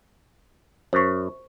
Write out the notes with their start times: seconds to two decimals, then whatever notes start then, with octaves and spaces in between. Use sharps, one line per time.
0.93 F#2 C5 C#6